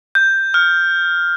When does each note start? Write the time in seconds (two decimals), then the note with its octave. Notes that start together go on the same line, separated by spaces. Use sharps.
0.15 G6
0.54 F6